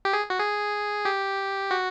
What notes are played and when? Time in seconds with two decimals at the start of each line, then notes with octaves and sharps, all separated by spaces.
0.05 G4
0.13 G#4
0.30 F#4
0.39 G#4
1.05 G4
1.71 F#4